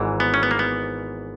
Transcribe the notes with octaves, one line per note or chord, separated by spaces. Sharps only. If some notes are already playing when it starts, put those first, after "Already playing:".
Already playing: G#1 G#2 E3
B3
C#4
B3
A#3
B3